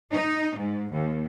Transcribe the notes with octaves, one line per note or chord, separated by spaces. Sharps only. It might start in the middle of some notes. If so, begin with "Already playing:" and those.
D#4
G#2
D#2